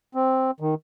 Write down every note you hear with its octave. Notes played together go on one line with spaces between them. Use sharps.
C4
D#3